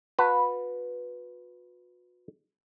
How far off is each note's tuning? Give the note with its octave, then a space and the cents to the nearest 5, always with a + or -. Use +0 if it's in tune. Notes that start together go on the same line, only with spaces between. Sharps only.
F#4 -40 B4 +0 A5 +35